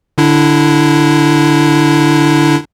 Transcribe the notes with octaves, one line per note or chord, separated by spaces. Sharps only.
D3 D4 E4